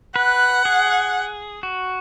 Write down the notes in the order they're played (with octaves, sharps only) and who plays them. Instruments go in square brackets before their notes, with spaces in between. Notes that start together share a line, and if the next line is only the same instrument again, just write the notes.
[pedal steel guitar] B4 [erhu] F#5
[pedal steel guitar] G#4
F#4